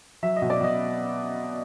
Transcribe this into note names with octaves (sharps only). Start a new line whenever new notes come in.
F#3 E5
D#5
B2
D5
B2 D#5